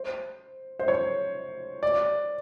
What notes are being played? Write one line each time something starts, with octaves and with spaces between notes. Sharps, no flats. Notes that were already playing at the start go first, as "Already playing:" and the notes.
Already playing: C5
C5
C#5
D5